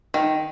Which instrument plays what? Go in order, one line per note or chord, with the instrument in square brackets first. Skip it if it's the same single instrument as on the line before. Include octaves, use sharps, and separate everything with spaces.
[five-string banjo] D#3